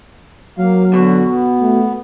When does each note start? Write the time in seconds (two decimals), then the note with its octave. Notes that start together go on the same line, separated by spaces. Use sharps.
0.58 F#3 A#3 F5
0.94 B2 D3 F#4
1.27 B3
1.61 A3